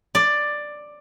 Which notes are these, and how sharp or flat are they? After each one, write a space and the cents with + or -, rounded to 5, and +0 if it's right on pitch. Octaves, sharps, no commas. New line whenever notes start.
D5 +10